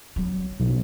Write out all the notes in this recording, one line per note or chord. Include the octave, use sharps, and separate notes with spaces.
F#3
B1